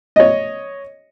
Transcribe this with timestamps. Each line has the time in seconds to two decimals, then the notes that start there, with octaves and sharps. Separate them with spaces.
0.16 C#5 D#5